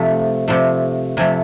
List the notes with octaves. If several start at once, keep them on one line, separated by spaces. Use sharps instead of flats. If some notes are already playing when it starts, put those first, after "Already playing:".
Already playing: C3 F3 A3
C3 F3 A3
C3 F3 A3 G#5